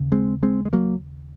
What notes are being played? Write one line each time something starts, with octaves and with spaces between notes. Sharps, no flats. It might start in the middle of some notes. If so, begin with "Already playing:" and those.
Already playing: D#2 C#3
G#3 C4
G#3 C4
G#3
F#3 A#3